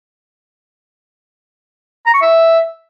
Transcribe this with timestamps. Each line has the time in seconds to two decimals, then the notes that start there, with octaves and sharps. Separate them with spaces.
2.06 A#5
2.14 C#6
2.22 E5